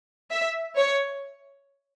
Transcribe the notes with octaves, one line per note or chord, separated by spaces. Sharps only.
E5
C#5